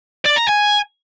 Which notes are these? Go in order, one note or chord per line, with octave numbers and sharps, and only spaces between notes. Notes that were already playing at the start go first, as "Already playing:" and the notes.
D5
A#5
G#5